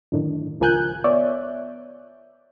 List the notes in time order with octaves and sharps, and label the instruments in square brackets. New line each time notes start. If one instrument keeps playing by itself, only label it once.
[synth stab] F#2 A2 D3 D#3
C#2 F3 A#4 G#5 F#6 G6
B3 C#5 D5 E5